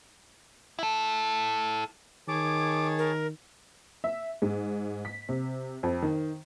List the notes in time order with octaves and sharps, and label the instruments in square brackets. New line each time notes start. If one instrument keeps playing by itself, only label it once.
[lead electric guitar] E4 A4
[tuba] D#3 [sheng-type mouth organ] G#4 C#5 A5 [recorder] D6
[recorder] A#4
[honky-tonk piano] E5
G#2
B6
C3
F2
D#3